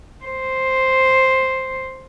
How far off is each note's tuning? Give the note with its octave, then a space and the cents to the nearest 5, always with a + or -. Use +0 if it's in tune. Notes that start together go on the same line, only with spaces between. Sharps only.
C5 +5